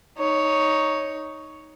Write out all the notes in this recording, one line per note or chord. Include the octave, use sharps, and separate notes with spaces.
D#4 C#5